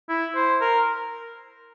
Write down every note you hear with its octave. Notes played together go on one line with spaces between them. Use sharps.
E4
C5
A#4